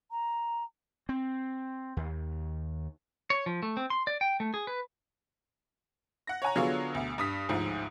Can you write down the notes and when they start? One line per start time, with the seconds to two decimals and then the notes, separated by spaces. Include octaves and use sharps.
0.11 A#5
1.09 C4
1.97 D#2
3.30 C#5
3.46 F3
3.63 A3
3.77 C4
3.90 C6
4.07 D5
4.21 G5
4.40 A3
4.54 G#4
4.67 B4
6.27 F#5 A#6
6.42 C#5 F#5 G#5 A#5
6.55 D3 F#3 B3 F4 G#4 C#5
6.94 D2 B2
7.18 G2 D#6 B6
7.49 A1 D2 G#2 F3